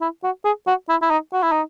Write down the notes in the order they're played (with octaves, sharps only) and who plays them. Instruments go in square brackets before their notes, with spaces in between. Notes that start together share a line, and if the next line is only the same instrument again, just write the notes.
[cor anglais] E4
F#4
G#4
F#4
E4
E4
D#4
F#4
E4
D#4